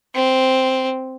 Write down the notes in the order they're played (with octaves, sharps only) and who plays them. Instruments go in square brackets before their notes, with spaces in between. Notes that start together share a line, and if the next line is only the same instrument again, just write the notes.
[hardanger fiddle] C4